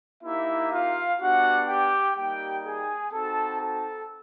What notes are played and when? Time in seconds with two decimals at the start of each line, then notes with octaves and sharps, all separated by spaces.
0.23 A#3 D#4 E4 G4 E5
0.71 F4 F5
1.19 B3 D4 F#4 G4 F#5
1.68 G4 G5
2.15 G3 A#3 D#4 G4 G5
2.64 G#4 G#5
3.12 C4 D#4 F#4 A4 A5
3.59 A4 A5